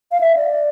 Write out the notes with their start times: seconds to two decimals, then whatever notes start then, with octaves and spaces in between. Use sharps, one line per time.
0.12 F5
0.21 E5
0.36 D5